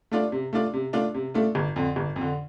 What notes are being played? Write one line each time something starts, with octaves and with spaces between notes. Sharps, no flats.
A3 D4 F4 D5
C3
A3 D4 F4 D5
C3
A3 D4 F4 D5
C3
A3 D4 F4 D5
G1
F2 D3
G1
F2
D3